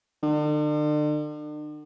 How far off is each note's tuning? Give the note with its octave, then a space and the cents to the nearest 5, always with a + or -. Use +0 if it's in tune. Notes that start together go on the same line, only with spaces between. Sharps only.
D3 +40